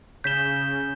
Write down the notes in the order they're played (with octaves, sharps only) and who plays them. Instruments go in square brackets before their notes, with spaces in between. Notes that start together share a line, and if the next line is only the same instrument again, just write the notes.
[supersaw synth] C#3 [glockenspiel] G6 B6 E7 G7